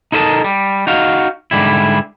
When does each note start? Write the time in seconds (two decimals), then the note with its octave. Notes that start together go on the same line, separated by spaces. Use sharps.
0.12 D#4 E4 A4 A#4 D#5 A5
0.44 G3
0.87 D#4 F#4 F5
1.51 G#2 D3 G3 E4